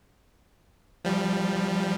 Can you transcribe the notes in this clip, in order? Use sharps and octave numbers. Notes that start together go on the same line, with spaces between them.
F3 G3